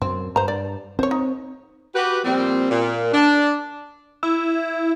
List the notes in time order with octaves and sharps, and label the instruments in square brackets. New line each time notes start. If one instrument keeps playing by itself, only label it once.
[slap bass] F#2 [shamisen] C4
[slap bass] G2 [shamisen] C5 A#5
[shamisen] D5
[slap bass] C4 [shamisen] C5 C#5
[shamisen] D#4
[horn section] F#4 G4 B4
A#2 F3 G3 C4
A#2
D4
[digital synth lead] E4